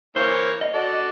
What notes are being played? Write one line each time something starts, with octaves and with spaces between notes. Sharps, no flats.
E3 A#3 C5 C#5
D#5
F#4 A4 D5